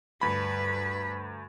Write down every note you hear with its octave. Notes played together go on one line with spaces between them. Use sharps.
D2 G2 B4 B5